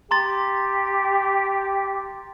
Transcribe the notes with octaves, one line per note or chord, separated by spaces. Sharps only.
G4 A#5 C6 A6